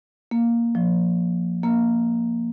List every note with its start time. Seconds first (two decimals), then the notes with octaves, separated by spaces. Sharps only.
0.31 A#3
0.75 F3
1.64 A#3